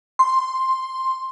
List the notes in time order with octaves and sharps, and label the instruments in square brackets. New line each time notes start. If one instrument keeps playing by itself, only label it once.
[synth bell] C6